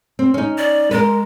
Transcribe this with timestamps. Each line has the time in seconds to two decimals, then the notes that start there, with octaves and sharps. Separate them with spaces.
0.19 C4
0.34 C#4 D#4
0.58 D5
0.91 G#3 A#4 B4